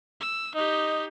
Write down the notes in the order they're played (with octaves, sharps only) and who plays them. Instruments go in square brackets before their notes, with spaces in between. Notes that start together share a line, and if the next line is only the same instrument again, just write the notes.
[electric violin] E6
[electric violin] D#4 G4 [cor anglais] D#5